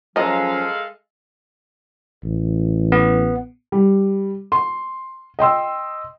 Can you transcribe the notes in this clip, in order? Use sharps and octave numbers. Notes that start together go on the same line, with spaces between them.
F3 F#3 G#3 C#4 A4 A#4 D#5 F5
A1
B3
G3
C6
D#5 G5 C6 E6